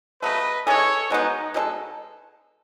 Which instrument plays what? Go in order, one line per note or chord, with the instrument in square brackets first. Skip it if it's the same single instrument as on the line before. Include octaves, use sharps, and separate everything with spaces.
[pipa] C#3 F#3 A3 [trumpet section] B4 D#5
[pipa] E3 G#3 C#4 G#4 [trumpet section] A4 C#5
[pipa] B2 G#3 B3 [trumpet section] D#4
[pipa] B2 G#3 D#4 A4